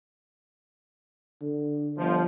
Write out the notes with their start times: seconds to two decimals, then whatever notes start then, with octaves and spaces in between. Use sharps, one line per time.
1.42 D3
1.98 G1 F3